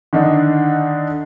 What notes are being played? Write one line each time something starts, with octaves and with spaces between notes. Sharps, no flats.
D3 D#3 D4 D#4